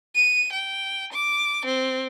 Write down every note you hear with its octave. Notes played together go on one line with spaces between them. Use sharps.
D#7
G5
D6
C4